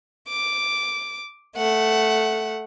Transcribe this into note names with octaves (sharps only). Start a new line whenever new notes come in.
D6
A3 F#5